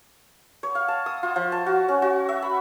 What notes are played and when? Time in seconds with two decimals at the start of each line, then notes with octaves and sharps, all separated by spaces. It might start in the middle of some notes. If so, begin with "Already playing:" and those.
0.63 C#5
0.75 F5
0.88 A5
1.06 D#6
1.23 F4
1.36 F3
1.52 A5
1.66 F#4
1.88 C#4
2.02 F#4
2.29 E5
2.42 B5